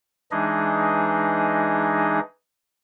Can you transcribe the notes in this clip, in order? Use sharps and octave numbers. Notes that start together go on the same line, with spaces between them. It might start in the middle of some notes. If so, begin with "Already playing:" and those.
E3 G#3 D4 D#4 G#4 D#5